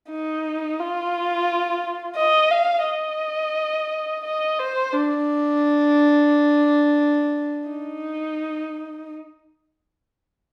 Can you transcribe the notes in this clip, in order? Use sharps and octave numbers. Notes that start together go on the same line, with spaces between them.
D#4
F4
D#5
F5
D#5
D#5
C5
D4
D#4